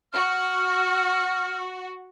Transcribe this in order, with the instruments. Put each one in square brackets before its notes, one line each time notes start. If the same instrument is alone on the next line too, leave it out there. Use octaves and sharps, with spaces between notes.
[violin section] F#4 [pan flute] F6